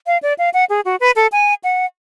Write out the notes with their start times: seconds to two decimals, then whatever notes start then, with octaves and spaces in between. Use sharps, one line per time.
0.07 F5
0.23 D5
0.39 F5
0.54 F#5
0.70 G#4
0.85 F#4
1.00 B4
1.16 A4
1.32 G#5
1.64 F#5